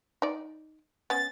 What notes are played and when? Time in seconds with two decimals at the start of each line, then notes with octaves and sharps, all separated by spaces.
0.22 D#4 D5
1.10 B3 C#4 A6